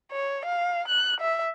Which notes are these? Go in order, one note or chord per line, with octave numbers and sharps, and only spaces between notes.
C#5
F5
F#6
E5